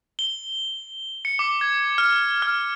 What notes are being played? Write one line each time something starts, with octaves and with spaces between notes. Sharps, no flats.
G7
C#7
D6
G#6
F6
F6